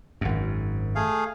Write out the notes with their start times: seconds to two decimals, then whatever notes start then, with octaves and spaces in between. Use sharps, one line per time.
0.21 G#1 F#2
0.95 A3 G#4 F5